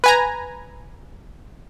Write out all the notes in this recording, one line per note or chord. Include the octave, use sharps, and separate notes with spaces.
B4 G#5 A#5